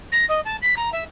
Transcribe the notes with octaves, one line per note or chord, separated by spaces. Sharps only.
A#6
D#5
A5
B6
A#5
E5